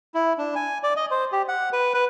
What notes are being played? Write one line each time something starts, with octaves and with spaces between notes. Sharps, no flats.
E4
D4
G#5
D5
D#5
C5
G4
F#5
B4
B4